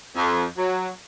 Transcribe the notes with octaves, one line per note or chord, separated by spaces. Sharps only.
F2
F#3